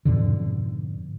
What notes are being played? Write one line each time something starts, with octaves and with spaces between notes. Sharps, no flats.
F2 G#2 B2 D3